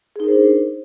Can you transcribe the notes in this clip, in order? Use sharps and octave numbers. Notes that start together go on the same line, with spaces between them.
D4 D#4 G#4 A#4 C5